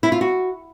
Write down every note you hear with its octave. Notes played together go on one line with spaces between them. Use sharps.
E4
F4
F#4